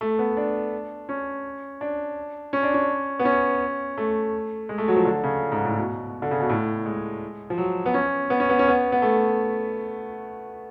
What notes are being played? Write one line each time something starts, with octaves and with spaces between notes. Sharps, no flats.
A3
B3
D4
C#4
D4
C#4
D4
C#4
B3
C#4
A3
G#3
A3
F#3
F3
D3
C#3
G#2
A2
B2
D3
C#3
B2
A2
G#3
F3
F#3
B3
C#4
B3
C#4
B3
C#4
B3
B3
A3